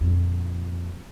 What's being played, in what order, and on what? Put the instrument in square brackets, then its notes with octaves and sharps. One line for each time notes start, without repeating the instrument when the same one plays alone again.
[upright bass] F2 A#2